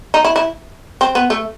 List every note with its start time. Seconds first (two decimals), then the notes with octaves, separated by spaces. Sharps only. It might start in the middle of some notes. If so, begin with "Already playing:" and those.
0.14 D#4
0.25 E4
0.36 E4
1.01 C4
1.15 B3
1.30 A3